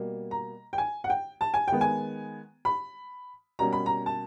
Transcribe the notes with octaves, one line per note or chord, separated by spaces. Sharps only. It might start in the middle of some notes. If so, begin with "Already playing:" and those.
Already playing: B2 G3 A#3
A#5
G5
G#5
F#5
G5
A5
G#5
D#3 G#3 B3 G5
G#5
B5
B2 G3 A#3 C#4 A#5
B5
A#5
A5